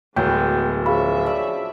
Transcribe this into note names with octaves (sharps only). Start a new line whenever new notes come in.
D1 F#3 G#3 B3 G5 G6
F3 C#4 G#4 E5 F5 B5 C#6
D4 D5